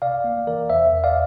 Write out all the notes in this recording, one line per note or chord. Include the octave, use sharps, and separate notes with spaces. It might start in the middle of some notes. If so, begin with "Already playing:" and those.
C3 D5 F5
A#3
E3 A#4 D5
E2 C5 E5
E2
D5 F5